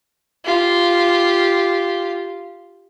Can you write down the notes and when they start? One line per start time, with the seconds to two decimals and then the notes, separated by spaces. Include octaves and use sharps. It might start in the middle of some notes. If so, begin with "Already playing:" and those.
0.45 F4 G4